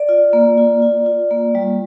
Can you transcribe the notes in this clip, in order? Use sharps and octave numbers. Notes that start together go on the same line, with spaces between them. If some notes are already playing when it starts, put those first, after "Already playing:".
Already playing: D5
F4
A#3
F4
F4
F4
A#3
G3